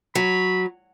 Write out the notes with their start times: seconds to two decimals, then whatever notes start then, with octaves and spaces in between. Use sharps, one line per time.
0.15 F#3 B5